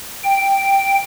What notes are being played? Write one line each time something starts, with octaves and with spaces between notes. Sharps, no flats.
G5